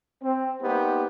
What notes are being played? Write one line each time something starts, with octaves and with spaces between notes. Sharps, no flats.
C4
G3 A#3 B3 D#4 G4 C5